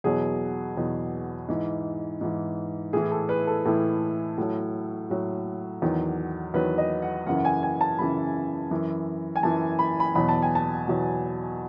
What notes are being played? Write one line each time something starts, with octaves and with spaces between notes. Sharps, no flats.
E2 B2 F#3 G#4
E2 B2 F#3
G#2 E3
G#2 E3
A2 E3 G#4
A4
B4
A4
A2 E3 A4
A2 F#3
A2 F#3
E2 D#3 F#3
E2 D#3 F#3 B4
D#5
F#5
F#2 C#3 E3 F#5
F#5
G#5
G#5
A5
F#2 C#3 E3 B5
F#2 E3
G#5
F#2 E3 A5
B5
B5
E2 B2 F#3 B5
A5
G#5
A5
E2 B2 F#3